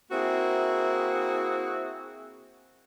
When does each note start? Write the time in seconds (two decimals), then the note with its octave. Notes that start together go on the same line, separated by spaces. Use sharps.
0.11 A#3 C4 E4 F#4 G#4